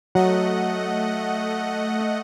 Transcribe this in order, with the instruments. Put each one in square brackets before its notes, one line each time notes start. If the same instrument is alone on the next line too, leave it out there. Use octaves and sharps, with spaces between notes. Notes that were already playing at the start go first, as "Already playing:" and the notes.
[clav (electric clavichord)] F#3 [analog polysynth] A3 D#5 F#5